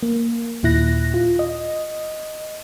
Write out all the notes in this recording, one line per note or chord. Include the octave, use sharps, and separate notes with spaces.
A#3
D#2 A#2 E4 F#6 A#6
F4
D#5